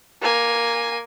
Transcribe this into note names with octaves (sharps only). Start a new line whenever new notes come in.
A#3 G#5